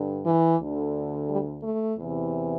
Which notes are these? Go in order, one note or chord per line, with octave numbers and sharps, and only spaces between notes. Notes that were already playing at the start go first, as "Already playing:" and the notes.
Already playing: G2 D3
E3
D2 D3
G3
A3
E2 C3 E3